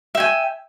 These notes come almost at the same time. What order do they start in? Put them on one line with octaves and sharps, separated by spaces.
E5 G5 G#5